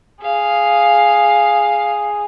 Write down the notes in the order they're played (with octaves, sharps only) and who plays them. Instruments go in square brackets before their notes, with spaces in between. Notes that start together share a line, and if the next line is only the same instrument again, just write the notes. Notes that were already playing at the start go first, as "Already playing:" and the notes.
[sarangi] G#4 [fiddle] F5